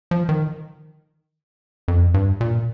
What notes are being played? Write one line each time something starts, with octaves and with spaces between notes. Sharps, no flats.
F3
D#3
F2
G2
A#2